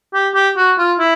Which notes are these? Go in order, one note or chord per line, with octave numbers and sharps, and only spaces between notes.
G4
G4
F#4
F4
E4